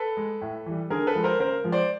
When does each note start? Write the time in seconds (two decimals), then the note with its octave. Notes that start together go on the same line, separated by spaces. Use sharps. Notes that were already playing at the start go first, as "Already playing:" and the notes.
Already playing: A4 B4
0.17 G#3
0.41 A2
0.66 E3 G3
0.90 D3 G#4 A#4
1.07 A4 B4
1.15 F3 G#3
1.24 A#4 C5
1.40 C#3 A#4 C5
1.64 F3 G#3
1.72 C5 D5